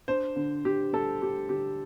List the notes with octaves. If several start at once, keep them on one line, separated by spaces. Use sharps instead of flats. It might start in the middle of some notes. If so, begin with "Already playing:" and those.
D4 C5
D3
D3 G4
G3 A4
D4 G4
D3 G4